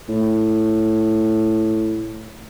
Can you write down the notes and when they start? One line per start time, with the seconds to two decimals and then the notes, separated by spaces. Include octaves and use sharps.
0.09 A2